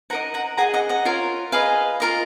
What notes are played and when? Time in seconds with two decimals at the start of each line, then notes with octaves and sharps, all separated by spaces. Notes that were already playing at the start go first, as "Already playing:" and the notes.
0.10 D#4 A#4 D#5 F#5 A#5
0.34 F#5 A#5
0.57 G#4 D#5 F#5 A#5
0.74 D#5 F#5
0.89 D#5 F#5
1.05 F4 A#4 C#5
1.52 G#4 B4 D#5 F5
2.00 F4 A#4 D#5